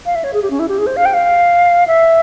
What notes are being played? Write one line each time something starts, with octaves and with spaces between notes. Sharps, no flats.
F5
E5
C#5
G#4
G4
C#4
E4
G4
G#4
C5
F5
G5
F5
E5